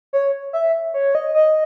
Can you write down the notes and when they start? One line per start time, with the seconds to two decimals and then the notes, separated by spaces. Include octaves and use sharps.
0.13 C#5
0.53 E5
0.94 C#5
1.15 D#5
1.35 D#5